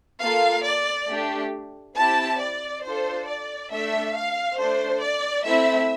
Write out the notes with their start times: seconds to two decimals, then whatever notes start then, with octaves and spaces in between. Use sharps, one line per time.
0.21 A#3 F4 A4 F5
0.65 D5
1.09 A3 D4 G4
1.96 C4 E4 G4 A5
2.40 D5
2.84 D4 F4 A4 C5
3.27 D5
3.71 A3 D4 A4 E5
4.15 F5
4.58 A3 D4 A4 C5
5.02 D5
5.45 A3 C4 E4 E5